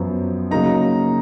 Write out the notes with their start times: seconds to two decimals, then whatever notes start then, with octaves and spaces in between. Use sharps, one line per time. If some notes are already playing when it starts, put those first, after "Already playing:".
Already playing: F#2 F3 B3
0.51 C#3 F#3 A#3 D#4 A#5